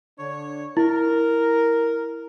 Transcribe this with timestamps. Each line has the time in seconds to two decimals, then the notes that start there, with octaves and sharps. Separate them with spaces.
0.19 D3 D4 C#5
0.77 E4 A#4